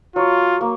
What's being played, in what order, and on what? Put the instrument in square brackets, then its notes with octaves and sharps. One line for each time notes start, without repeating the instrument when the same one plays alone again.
[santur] F#3 [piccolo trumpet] F4
[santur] A#3